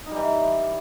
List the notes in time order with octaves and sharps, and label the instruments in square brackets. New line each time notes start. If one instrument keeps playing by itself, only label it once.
[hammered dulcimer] D#4
G3
E3